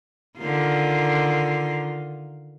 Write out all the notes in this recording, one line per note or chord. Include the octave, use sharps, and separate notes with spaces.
D3 D#3 F4